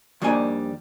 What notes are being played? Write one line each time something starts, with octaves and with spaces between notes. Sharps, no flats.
F2 D#3 G3 A#3 D4 G#5